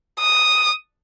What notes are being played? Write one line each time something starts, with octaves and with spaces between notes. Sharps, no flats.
D#6